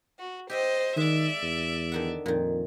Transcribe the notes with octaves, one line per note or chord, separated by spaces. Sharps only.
F#4
G4 C5 D#5 E5 G5
D#3 G#3 D5 E5
E2
D3 D#3 F#5
F2 A#2 D#3